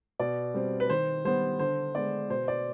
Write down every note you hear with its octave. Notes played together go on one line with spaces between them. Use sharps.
B2 D5
G3 C4
B4
D#3 C5
G3 B3 C5
D3 C5
G#3 B3 D5
B2 C5
D5